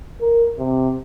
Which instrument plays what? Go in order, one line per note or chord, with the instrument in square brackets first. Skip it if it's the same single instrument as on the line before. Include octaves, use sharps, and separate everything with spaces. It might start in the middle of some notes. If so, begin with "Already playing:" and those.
[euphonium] A#4
C3